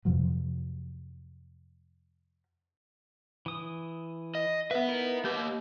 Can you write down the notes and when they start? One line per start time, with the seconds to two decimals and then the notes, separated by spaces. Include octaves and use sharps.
0.05 F2 C3 F3 F#3
3.46 E3 D#6
4.35 D#5
4.71 B4 E5 F#5
4.88 D#4 E4 A#4
5.25 A#3 G4 D#5 G6